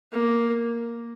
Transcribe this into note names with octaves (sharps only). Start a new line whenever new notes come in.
A#3